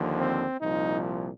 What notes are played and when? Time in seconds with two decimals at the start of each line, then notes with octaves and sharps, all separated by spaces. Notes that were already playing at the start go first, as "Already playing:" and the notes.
Already playing: D#2 D3 F3
0.19 C4
0.61 C2 A#2 F3 D#4